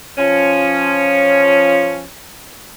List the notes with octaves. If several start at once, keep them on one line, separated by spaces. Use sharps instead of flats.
F3 C#4